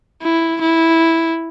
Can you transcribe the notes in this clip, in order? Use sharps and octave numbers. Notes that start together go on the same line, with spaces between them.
E4
E4